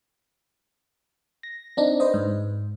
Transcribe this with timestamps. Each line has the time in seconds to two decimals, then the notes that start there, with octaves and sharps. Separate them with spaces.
1.43 A#6
1.77 C4 D4 D#4
2.00 B4 C5 D#5
2.14 G#2